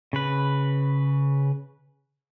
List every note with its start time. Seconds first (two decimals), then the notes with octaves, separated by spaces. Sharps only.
0.13 C#3 B4